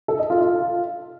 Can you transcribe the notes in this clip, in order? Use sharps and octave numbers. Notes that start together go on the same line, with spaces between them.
A4
D#5
F4
F4